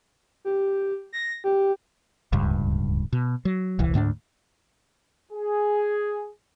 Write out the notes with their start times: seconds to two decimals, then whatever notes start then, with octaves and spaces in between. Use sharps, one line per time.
0.45 G4
1.13 A#6
1.44 G4
2.33 D1 C#2 G2
3.13 B2
3.45 F#3
3.79 D#1 C2 E3
3.94 D2 G#2 C4 D4
5.32 G#4